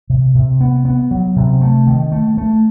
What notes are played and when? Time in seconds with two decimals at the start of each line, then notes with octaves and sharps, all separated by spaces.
0.10 C3
0.35 C3
0.61 B3
0.85 B3
1.11 F#3
1.36 C3
1.61 A3
1.87 D#3
2.12 A3
2.37 A3